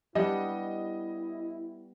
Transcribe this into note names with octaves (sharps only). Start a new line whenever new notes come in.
G3 B3 D4 E4 D#5